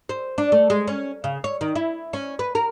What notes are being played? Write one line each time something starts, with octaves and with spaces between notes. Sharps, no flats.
C5
D4
A3
G#3
C#4
C#3
C#5
D#3
E4
C#4
B4
A#4